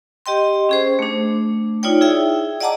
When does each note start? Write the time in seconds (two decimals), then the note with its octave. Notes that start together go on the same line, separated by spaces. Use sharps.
0.26 G4 D#5 G5 C6
0.69 C#4 G#4 C5
0.99 A3 D4
1.83 D#4 F4 C#5 D5 G5
2.01 E4 G#4 E5 G5
2.60 D5 D#5 F#5 A5 A#5 D6